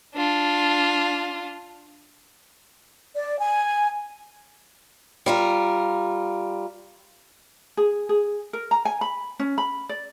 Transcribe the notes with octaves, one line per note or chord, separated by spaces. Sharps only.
D4 F4
D5
G#5
G3 F4 A#4
G#4
G#4
A#4
A#5
G#5
B5
C#4
B5
D5